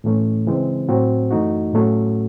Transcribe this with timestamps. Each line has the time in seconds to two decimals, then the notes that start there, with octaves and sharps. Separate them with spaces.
0.04 A2 E3 A3 C#4
0.47 C#3 E3 G#3 C4
0.89 A2 F#3 C4 F#4
1.31 F#2 E3 A3 D#4 F#4
1.73 A2 F#3 A3 C#4 F#4